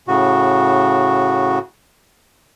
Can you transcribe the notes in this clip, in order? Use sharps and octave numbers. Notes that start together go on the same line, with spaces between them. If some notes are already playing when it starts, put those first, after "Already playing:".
A2 C#3 F#4